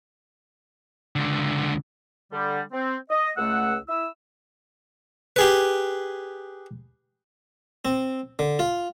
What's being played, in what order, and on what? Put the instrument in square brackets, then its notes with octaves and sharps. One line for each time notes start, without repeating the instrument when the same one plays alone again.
[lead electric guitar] C#2 D3
[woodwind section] D3 G3
C4
D#5
C#2 A3 F#5 E6
E4 E6
[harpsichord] G4 G#4 B4
C4
D3
F4